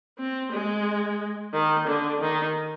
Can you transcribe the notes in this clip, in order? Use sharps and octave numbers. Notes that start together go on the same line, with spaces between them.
C4
G#3
D#3
D3
D#3